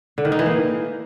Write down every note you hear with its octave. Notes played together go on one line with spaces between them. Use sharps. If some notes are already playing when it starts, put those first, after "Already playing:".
D3
D#3
D#4
E3
A#3